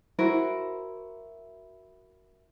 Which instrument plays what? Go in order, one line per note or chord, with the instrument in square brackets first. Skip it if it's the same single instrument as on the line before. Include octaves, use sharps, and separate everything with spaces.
[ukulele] E4 F#4 A#4 C5